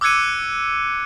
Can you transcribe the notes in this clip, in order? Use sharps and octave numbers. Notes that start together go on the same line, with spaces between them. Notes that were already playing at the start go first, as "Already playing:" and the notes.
D6 E6 F#6 G#6 C#7 D#7